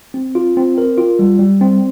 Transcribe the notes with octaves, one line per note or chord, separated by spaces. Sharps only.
C4
F4
C4
A#4
F4
G3
G3
C4